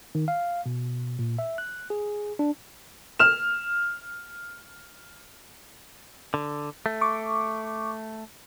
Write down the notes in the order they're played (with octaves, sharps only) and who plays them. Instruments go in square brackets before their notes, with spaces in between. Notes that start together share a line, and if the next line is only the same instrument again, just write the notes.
[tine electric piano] D#3
F5
B2
A#2
E5
F#6
G#4
D4
[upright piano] F6 E7
[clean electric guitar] D3
A3
[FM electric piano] C#6 D6